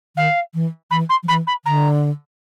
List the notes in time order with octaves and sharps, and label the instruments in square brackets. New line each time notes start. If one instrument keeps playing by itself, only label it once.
[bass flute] D#3 [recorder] F5
[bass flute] E3
[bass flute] E3 [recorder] B5
[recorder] C6
[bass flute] F3
[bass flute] E3 [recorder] B5
[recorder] B5
[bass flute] D3 [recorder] A#5